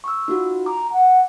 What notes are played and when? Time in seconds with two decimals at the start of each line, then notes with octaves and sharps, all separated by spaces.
0.04 C#6 E6
0.28 D#4 F4 F#4
0.66 A#5 D6
0.92 F#5